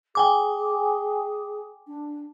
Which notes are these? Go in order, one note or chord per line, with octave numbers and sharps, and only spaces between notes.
G#4 G5 G#5 D6
D4